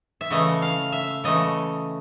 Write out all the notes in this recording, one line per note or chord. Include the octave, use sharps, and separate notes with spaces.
E5
C#3 E3 A3 D#5
F5
E5
C#3 E3 A3 D#5